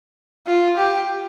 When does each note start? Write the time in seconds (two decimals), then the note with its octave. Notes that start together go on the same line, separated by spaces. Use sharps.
0.47 F4
0.77 G4